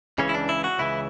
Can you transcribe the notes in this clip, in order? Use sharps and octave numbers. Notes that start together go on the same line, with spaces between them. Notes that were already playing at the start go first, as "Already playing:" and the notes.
C#2 C#3 E3 C#4
E4
D4
E4
F#4
C#2 C#3 E3 E4